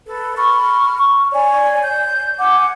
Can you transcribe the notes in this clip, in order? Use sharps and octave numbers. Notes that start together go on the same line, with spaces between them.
A4 B4
B5 C#6 F6
C#6
C#5 D5 G#5
G6
F#5 G#5 D6